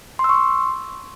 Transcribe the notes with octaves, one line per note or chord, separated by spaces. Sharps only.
C6
E6
C#6
C6